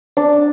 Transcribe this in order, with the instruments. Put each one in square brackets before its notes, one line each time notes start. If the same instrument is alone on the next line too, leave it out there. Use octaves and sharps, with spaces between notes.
[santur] D4